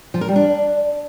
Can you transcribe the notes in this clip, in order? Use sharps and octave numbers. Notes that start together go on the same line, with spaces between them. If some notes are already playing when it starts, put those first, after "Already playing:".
F3
A#4
G3
D4